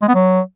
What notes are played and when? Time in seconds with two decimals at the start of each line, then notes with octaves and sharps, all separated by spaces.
0.02 G#3
0.08 B3
0.15 F#3